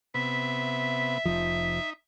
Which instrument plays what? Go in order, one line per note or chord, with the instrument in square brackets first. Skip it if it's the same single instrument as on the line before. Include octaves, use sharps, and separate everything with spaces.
[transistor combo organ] C3 B3 [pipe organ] E5
[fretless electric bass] F1 F3 [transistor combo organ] D#4